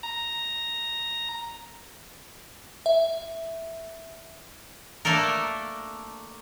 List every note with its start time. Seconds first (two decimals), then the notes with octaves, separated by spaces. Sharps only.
0.03 A#5
2.86 E5
5.05 A3 A#3 D4 A4 A#4